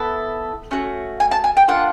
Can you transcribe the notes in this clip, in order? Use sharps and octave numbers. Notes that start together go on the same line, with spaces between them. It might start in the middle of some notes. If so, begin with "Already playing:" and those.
Already playing: B3 E4 A4
A3 C#4 F#4
G#5
A5
G#5
G5
A#3 D4 F4 F#5